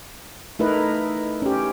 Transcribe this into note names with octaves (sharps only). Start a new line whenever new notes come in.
A3 D#4 E4 A#4 B4 D#5
C#4 G4